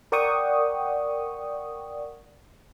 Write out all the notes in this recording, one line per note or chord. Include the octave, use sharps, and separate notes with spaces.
A#4 D5 F#5 G5 C#6 D#6